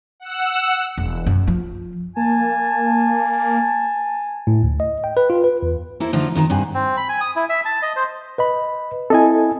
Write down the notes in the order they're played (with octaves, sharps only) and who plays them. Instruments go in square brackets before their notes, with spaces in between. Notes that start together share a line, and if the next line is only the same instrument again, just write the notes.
[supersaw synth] F#5 E6
[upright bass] E1
F#2
F3
[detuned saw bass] A#3 [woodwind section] G#5 A5
[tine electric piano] A2
D2
D#5
G5
B4
F4
B4
E2
[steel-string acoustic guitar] A#3 E4 A4 C5
D3 F3 A3 D#4 F4
F2 D#3 G#4 A#5
G2 C3 F#5 G#5
[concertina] C4
B5
G#5
D#6
E4
E5
A5
D#5
C5
[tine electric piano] B4 D#5 B5
[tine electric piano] C4 E4 [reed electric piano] A4 D#5 G#5